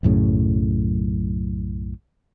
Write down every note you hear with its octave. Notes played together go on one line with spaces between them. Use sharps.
B1 F#2 A2 C#3